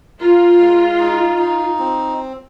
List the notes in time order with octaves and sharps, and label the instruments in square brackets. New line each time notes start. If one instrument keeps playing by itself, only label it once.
[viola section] F4 [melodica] A#4
[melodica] G#3
D#4
D#4
C4